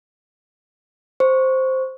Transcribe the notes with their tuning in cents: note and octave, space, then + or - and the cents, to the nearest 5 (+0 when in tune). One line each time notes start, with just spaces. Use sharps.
C5 +0 C#6 +0